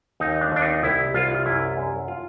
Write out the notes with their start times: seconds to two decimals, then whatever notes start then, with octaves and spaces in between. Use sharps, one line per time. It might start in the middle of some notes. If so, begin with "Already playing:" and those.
0.20 D#2 D#4
0.41 D4
0.52 D#2 D4
0.62 D#4
0.83 C2 E4
1.14 C2 F4
1.35 F4
1.46 F#2 E4
1.77 F#2
2.08 F4